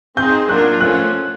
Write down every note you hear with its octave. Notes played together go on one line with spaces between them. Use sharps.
C4 D#4 G#4 C5 G6
F#3 A#3 D4 F4 A#4 F#6
F3 A3 C#4 F#6